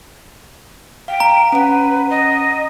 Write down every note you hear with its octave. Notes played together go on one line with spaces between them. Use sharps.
F5 G5
A#5
C#4 B4 F#5
D#5